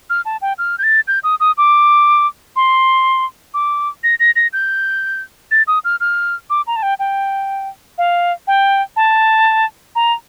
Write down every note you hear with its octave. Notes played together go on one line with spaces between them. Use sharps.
F6
A5
G5
F6
G6
A6
G6
D#6
D#6
D6
C6
D6
A#6
A#6
A#6
G6
A6
D#6
F6
F6
D6
A#5
A5
G5
G5
F5
G5
A5
A#5